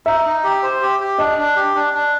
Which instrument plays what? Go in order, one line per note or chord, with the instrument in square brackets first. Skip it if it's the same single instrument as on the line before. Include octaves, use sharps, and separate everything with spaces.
[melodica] D#4 [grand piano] E5
[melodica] D#4
G4
C5
G4
G4
[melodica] D4 [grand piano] D#5
[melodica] D4
G4
D4
D4